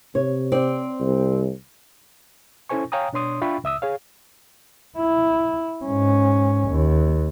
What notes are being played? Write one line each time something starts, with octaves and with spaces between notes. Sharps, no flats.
C3 C#5
C4 D5
C2
C#4 E4 A4 C5 G#5 C#6
C#5 F5 G5 G#5 A#5 D#6
B2 D4 C#5 C6 D#6
D4 F4 E5 G5 B5 C#6
C#2 E5 D#6 E6
G#4 C#5 F5
E4
G#2 C#4
D#2